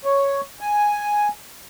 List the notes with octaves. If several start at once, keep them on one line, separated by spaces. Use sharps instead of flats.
C#5
G#5